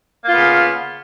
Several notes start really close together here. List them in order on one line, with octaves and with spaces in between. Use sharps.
A#3 F4 B3 C#3